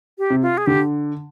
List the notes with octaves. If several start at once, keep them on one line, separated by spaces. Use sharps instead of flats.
G4
C3
F4
G#4
D3 G4